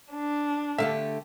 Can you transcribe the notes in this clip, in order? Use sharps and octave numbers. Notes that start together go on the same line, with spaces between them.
D4
D3 A3 G4 E5 F5